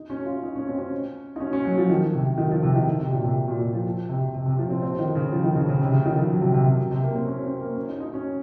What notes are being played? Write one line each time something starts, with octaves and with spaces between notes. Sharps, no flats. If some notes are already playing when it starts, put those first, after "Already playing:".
Already playing: D#4
C#4
F4
D#4
C#4
C4
C#4
D#4
C#4
C#4
F#3
F3
D#3
C3
D#3
F3
C3
D#3
C3
A#2
C3
A#2
A#2
F3
C3
C3
C3
F3
C4
C4
D#3
C#3
F3
D#3
C#3
C#3
C3
C#3
D#3
F3
F#3
C3
C3
C3
C3
A#3
C4
C#4
C4
A#3
C#4
D#4
D#4
C#4